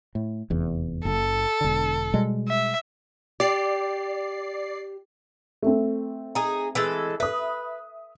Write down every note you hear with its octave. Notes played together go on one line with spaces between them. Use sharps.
A2
F1 E2
F#1 A4
E1 D3
B2 G3 G#3
E5
G4 D5 C7
A3 C4
D#4 G#4
E3 G#3 A4
B4 E5 D#6